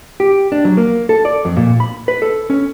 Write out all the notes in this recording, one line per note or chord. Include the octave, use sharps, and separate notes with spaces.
G4
D4
F#3
A#3
A4
D5
F2
A#2
B5
B4
A4
C#4